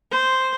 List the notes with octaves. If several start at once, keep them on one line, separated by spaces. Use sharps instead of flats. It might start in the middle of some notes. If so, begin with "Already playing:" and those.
C5